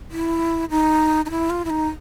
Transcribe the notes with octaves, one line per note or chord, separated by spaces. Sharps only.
E4
D#4
D#4
E4
F4
E4
D#4